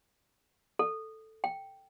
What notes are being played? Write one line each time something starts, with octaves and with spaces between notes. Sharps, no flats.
A4
G5